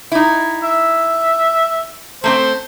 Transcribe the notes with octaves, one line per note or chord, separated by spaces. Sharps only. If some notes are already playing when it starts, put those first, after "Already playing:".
D#4 E4
E5
A3 A#3 C4 C5